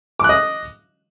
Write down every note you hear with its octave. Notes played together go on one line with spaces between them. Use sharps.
D#5 D6 F#6